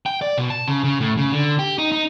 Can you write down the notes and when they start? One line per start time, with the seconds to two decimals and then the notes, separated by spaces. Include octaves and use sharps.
0.06 G5
0.21 D5
0.38 B2
0.50 A5
0.68 C#3
0.84 C#3
1.00 A2
1.18 C#3
1.32 D3
1.59 G4
1.78 D#4
1.92 D#4